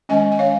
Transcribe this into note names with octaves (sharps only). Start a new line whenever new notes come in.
D#3 G#3 C#4 D#5 G#5
G#5
C#5 F5